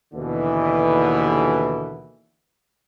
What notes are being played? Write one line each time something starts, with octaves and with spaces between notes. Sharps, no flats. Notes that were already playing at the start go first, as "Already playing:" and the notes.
D#2 B2 D3 E3